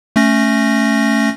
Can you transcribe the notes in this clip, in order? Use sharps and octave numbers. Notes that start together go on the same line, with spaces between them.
A3 C#4 A#6